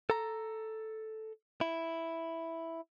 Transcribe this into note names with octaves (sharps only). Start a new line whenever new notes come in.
A4 A#5
E4